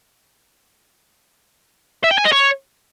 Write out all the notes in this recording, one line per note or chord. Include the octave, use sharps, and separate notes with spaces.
E5
G5
G#5
D#5
C#5